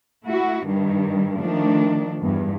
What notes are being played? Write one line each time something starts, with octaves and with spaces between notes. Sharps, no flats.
A3 E4 F#4
G2 D#3 G3
D#3 F3 A3 D4
E2 G2